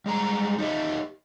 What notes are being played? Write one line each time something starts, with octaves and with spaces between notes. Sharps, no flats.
G3 G#3 A#5
D#4 G4 D#5 E5